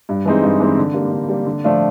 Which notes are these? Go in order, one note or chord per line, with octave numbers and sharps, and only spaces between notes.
G2
E3 G#3 C4 D#4
G2
E3 G#3 C4 D#4
D3
G3 A#3
D3
G3 A#3
D3
F3 A3 D4 F4